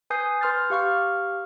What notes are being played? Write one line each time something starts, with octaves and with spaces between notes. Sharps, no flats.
B4 G#5 D#6 G6 C7
B4 C6 F6 G6 A6
G4 F5 C#6 F6